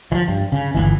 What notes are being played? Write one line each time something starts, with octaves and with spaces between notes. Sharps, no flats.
E3 F3
G2
C#3
G1 C#2 E3